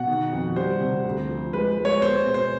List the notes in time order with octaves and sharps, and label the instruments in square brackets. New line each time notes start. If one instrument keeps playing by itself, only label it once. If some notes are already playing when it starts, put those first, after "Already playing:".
Already playing: [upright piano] B2 [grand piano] F#5
[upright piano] D#3
F2
[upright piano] G3 [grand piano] C5
[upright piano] C3
D2
F3
[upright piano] G#3 [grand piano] B4
[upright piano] G#3
[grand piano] C#5
[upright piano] B3 [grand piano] C5
[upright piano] B2
[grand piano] C5